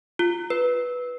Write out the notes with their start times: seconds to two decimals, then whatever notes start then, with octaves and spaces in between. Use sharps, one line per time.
0.19 F4
0.50 B4